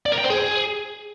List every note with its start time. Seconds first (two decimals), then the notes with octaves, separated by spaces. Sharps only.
0.06 D5
0.12 A#4
0.18 G5
0.24 C5
0.30 G#4